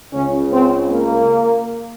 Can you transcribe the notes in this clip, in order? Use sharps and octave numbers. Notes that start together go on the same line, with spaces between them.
C#2 C#3 C#4
C4
A#3